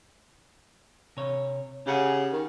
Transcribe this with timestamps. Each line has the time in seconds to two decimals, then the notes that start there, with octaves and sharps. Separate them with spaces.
1.17 C3 C#5
1.87 C#3 G4 F#5 G#5
2.32 D#3